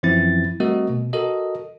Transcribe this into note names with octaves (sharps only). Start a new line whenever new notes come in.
F#2 E3 F3 C4 E4 A6
G3 A3 C4 F#4 A#4 D#5
B2
F#4 A4 A#4 D#5